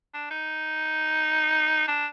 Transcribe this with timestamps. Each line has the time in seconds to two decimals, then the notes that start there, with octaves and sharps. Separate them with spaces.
0.14 D4
0.31 D#4
1.88 D4